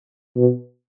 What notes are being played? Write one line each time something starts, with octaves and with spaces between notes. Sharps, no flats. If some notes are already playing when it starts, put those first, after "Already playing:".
B2